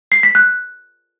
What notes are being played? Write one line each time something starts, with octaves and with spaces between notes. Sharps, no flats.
C7
B6
F#6